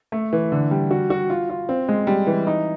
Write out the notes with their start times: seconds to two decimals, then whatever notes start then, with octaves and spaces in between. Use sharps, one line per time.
0.12 A3
0.33 E3
0.52 D3
0.71 G3
0.91 F#4
1.10 F#4
1.30 F4
1.50 F4
1.69 C4
1.88 G#3
2.07 G3
2.27 E3
2.47 D#4